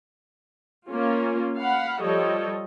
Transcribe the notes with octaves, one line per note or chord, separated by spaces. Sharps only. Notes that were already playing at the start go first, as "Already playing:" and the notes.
A#3 C#4 F4
F5 F#5 B5
F3 G3 A4 C#5 D#5